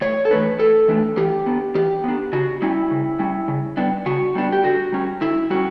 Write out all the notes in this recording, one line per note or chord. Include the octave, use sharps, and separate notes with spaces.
A2 C#5
A4
E3 A3 D4 B4
A2 A4
E3 A3 D4
E3 G4
B3 D4
E3 G4
B3 D4
C#3 F#4
G3 C#4 E4
C#3
G3 C#4
C#3
G3 B3 D4
C#3 F#4
G3 B3 D4
G4
D3 F#4
G3 C#4
D3 E4
G3 C#4 F#4